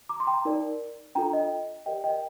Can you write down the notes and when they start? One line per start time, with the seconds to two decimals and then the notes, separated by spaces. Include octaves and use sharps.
0.09 A#5 D6
0.20 C6
0.27 G5 A#5
0.45 D#4 A#4 D5
1.15 D4 F4 A4 G5 A#5
1.33 D#5 G5
1.86 G4 A#4 D5 D#5 G5
2.04 D#5 G5